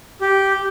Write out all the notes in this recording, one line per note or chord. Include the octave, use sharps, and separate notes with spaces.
G4